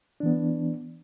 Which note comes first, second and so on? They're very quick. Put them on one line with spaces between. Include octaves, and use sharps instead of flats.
D4 E3 B3